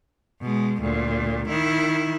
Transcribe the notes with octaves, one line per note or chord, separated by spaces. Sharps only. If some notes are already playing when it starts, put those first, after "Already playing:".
B2 G#3
D2 A#2
D#3 E4